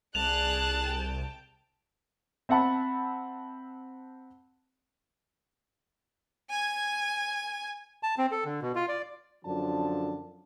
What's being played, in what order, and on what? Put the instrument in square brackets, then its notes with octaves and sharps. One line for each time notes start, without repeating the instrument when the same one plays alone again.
[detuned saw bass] C2 [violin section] G#4 D5 F#6 [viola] A5 [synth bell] F7
[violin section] G5
[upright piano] C4 E5 F#5 A5 B5
[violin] G#5 G#6
[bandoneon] A5
C4
A4
D3
B2
F4
D5
[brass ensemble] F#2 D3 F3 D4 A5